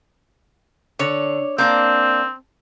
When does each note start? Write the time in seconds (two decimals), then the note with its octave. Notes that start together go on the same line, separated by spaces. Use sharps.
0.99 D3 C#5
1.58 A#3 C4 D4 A5 G6